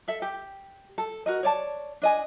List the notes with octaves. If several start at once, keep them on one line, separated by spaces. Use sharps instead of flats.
A4 E5
G4
A4
F#4 A#4 D#5
C#5 D5 A5
D4 D#5 G#5